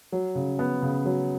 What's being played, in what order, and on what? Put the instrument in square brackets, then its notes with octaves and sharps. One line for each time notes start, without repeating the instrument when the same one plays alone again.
[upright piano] F#3
C#3
B3
C#3
F#3